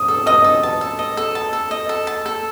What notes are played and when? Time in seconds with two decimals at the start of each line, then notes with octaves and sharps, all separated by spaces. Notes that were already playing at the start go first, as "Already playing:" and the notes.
Already playing: D#6
0.08 A4
0.26 D#5 D#6
0.44 A4
0.63 A5
0.81 A4
0.99 D#5
1.17 A4
1.35 A5
1.53 A4
1.71 D#5
1.89 A4
2.07 A5
2.26 A4